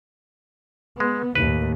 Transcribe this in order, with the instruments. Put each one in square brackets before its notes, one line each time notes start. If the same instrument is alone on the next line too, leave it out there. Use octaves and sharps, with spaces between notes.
[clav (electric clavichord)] G#3 [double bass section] B3
[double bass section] D#2 A2 [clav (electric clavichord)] B4